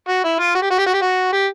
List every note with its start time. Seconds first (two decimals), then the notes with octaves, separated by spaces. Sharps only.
0.08 F#4
0.24 E4
0.39 F4
0.55 F#4
0.62 G4
0.70 F#4
0.78 G4
0.86 F#4
0.94 G4
1.02 F#4
1.32 G4